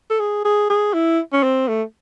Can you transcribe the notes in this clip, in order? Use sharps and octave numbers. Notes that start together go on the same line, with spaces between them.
A4
G#4
G#4
G#4
E4
C#4
C4
A3